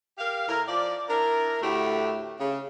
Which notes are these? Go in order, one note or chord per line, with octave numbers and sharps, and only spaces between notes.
G4 A#4 F5
A2 E4 A#4
F3 D5
D4 E4 A#4
D2 A2 A3 E4 G4
C#3